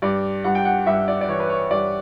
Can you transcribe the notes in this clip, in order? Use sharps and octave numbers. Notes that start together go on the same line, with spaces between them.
G2 D5
G2 F#5
G5
F#5
G2 E5
D5
D5
E3 C#5
B4
C#5
G2 D5